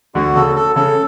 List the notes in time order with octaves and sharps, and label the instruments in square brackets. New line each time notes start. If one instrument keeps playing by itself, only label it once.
[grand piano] D2 D3 [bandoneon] F#4
[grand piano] C#3 [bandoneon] A4
[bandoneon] A4
[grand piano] C#3 C#4 [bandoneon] A4